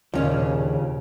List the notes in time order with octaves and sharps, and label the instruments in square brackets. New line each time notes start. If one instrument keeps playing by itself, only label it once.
[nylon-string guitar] D#2 [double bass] A#2 C#3 [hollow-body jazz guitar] F3 C#4 D4